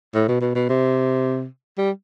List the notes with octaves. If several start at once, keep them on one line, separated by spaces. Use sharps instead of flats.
A2
B2
B2
B2
C3
G3